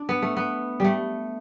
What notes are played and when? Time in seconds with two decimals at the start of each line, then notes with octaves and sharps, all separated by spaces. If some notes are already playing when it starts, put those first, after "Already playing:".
Already playing: D4
0.09 B3
0.22 A3
0.37 B3
0.80 G3 A3